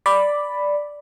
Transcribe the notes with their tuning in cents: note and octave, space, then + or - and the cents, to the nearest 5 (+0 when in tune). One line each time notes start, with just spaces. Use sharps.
D5 +0 B5 +0